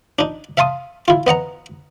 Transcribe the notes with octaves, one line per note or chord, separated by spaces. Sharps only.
D4 D#4
E5 F5 A5 C6 D#6
E4 F4
B3 D#5 F#5 A#5